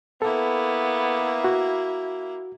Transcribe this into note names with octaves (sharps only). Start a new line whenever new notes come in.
A#3 B3 E4 A4
F#4